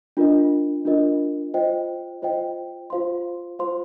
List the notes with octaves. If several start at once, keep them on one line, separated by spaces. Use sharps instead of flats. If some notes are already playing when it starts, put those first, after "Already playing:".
D4 F4 A#4 D#5
D4 F4 A#4 D#5
F4 C5 D#5 G5
F4 C5 D#5 G5
F4 C5 F5 C6
F4 C5 F5 C6